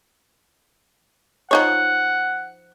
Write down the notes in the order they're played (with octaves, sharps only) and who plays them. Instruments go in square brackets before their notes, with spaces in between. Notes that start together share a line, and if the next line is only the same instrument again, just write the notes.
[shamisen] F3 D#4 C#5 [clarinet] F#5